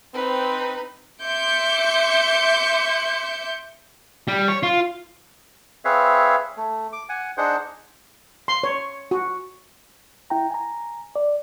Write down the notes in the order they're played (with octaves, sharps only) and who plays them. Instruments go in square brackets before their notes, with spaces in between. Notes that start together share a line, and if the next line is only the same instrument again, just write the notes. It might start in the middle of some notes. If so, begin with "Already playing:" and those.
[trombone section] C4 [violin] D#4 B4
[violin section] E5 C6 D6 G6 C#7
[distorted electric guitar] G3
C#5
F4
[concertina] C4 G#4 B4 C#5 E5 F5
A3
D6
F#5 G#5
D4 D#4 G#4 C5 F#5
[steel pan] C6
C#5
F#4
[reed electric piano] E4 G5 A#5
G#5 A#5
D5